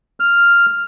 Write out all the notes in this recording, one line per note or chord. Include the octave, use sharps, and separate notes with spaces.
F6